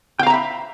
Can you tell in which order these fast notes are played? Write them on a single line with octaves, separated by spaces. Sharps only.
G5 F5 A#5 E5 B5